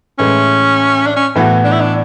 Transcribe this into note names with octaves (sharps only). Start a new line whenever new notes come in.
A2 E3 G#3 C#4
D4
C#4
A2 E3 B3 F#4
D4
E4
D4